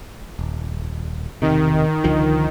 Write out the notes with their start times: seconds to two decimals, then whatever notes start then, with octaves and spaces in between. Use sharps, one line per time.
0.39 D#1
1.42 E1 C3 D#3
2.04 C#2 D3 F3